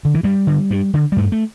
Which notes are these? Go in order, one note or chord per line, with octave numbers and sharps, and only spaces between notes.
D3
E3
G2 G3
D3
G2
D3
G3
G2 A3
A3